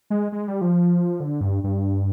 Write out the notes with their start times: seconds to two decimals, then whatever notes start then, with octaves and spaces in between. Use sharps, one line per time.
0.10 G#3
0.32 G#3
0.48 G3
0.61 F3
1.20 D3
1.41 G2
1.64 G2